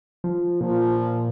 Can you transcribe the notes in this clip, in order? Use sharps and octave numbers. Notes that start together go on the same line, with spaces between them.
F3
A#2 F3